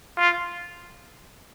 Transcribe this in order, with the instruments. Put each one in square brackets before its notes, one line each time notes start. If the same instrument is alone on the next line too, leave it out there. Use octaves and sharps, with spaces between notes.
[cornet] F4